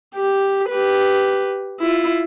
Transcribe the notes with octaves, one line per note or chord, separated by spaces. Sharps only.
G4
G4 B4
E4 F4